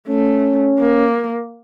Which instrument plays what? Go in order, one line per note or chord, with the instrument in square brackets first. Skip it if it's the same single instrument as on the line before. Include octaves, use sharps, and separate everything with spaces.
[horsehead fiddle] A3 [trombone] C#4
[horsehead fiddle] A#3